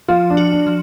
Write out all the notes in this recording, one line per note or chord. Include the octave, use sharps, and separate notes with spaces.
F3 F4
D4
F#4
D4
F3